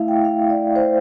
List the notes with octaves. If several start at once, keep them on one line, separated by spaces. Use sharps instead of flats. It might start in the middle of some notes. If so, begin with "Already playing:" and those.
Already playing: A3 E4 E5 F5
G5
F5
D5
C5